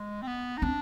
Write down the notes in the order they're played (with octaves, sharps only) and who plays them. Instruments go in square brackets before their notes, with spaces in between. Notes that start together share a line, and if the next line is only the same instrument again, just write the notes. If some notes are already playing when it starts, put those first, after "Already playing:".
Already playing: [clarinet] G#3
C4
B3
D#4
[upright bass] C4 [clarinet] D4